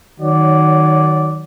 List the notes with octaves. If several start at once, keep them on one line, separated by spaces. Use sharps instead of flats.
D#3 F#3 F#4 C#5 D5